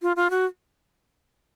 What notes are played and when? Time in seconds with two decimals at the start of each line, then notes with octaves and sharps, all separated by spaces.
0.02 F4
0.16 F4
0.30 F#4